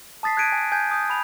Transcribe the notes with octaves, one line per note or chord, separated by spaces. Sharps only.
A5 D#6 A6 B6 C7
F#6 G#6 B6 D7 D#7
G#5
G#5 G6 G#6
D#6 G6
B5 F7